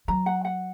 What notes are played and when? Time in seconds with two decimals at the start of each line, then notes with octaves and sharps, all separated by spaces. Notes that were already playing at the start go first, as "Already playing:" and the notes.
0.08 F#3 A#5
0.26 F#5
0.45 F#5